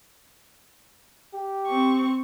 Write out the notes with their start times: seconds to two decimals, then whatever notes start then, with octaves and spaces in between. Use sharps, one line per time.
1.33 G4
1.67 C4 C#6